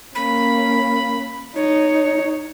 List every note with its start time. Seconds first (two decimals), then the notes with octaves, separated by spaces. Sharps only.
0.15 A#3 C#4 B5
1.56 D#4 C#5